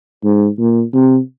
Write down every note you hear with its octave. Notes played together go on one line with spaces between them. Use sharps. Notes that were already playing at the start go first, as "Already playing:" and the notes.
G#2
A#2
C3